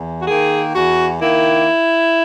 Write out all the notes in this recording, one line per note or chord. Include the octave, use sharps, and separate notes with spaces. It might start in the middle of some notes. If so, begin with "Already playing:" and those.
Already playing: E2
F#4
D#3 A#3 G#4
E2 F#4
D#3 A#3 E4